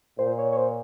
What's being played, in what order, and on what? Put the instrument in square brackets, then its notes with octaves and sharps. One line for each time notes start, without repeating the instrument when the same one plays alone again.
[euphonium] A#2 [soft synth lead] C5
[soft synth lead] C#5
C#5
C5